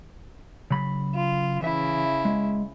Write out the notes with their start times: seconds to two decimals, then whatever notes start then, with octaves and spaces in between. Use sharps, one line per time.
0.71 C#3 F#3 B5
1.14 F4
1.62 C#3 E3 E4 E5
2.25 G#3